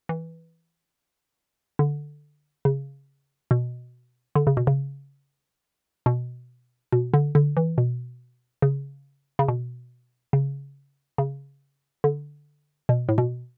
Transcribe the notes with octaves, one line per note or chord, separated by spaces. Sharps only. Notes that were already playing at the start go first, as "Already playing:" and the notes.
E3
D3
C#3
B2
D3
C#3
B2
C#3
B2
B2
D3
D3
E3
B2
C#3
C#3
B2
C#3
C#3
D3
B2
A2
B2